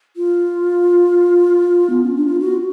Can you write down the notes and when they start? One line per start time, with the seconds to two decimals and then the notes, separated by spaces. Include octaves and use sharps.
0.17 F4
1.90 B3
2.03 C#4
2.16 D4
2.27 F4
2.40 F#4